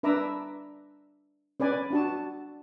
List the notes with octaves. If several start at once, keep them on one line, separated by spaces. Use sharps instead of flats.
D4 B4 E5 A#5 D6 E6
C#4 B4 D5 G#5
D4 F#4 A5